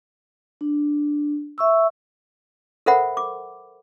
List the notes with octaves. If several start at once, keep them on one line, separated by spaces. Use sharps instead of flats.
D4
E5 C#6 E6
A4 A#4 C5 E5 F#5 B5
D6